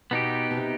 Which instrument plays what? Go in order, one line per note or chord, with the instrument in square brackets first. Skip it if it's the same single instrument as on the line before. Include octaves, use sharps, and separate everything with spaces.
[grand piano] B2 [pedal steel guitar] B3 D#4 G4
[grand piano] B2
C3